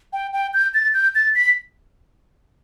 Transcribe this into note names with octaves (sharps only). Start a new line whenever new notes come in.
G5
G5
G6
A6
G6
A6
B6